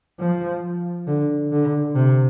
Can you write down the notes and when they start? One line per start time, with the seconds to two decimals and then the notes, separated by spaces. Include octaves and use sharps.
0.20 F3
1.07 D3
1.52 D3
1.95 C3